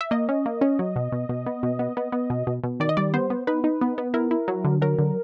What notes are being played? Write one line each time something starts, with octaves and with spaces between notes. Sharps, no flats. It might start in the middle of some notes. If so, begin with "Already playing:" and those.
E5
A#3 D#5
C#4
A#3
C#4
F#3
B2
B2
B2
B3
B2
B3
B3
B3
B2
B2
B2
D#3 D5
D#5
G3 D5
B3 C5
B3
D#4 B4
D#4
B3
B3
E4 A#4
E4
F#3
D3
F#3 A#4
D3